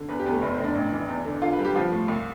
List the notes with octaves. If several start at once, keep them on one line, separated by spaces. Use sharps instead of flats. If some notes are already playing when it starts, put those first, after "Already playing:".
Already playing: D3
E2 B4
G4
E2 B3
A3
F1 B3
C4
F1 D4
A1
E3
E2
D3
D3 F4
B4
G3
G4
F3 F4
A2
C2